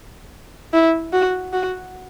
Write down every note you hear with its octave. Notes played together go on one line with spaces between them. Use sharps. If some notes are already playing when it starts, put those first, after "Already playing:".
E4
F#4
F#4